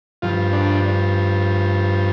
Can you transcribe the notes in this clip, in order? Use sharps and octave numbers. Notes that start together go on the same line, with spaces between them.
G2 F3 F4
D4